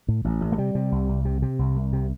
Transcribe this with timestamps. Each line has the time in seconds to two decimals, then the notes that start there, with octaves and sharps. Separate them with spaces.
0.08 A2
0.24 A1
0.41 A1
0.52 A3
0.58 C3 G3
0.75 C3
0.92 C2
1.09 C2
1.25 C3
1.42 C3
1.59 C2
1.76 C2
1.93 C3